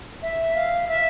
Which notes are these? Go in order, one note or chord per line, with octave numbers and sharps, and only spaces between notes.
E5
F5
E5